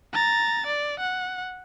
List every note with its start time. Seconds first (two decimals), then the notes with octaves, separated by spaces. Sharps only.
0.13 A#5 A6
0.67 D5
1.00 F#5